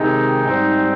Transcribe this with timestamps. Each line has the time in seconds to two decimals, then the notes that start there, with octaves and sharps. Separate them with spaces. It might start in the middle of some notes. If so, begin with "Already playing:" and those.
Already playing: C3 D#3 G#3 C4 D#4
0.45 G#2 G3 C4